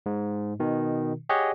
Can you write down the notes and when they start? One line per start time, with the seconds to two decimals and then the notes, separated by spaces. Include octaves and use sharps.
0.06 G#2
0.60 B2 D#3
1.29 G4 G#4 C#5 D#5 F#5